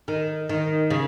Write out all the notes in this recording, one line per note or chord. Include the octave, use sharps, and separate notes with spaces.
D#3
D#3
C#3